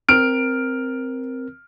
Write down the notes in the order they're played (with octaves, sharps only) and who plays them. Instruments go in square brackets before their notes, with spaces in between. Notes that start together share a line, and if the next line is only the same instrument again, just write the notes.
[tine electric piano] C4 A#4 [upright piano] F6 D7